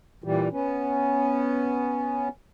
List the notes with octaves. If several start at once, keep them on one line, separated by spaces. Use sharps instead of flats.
A#2 E3 G3
B3 C#4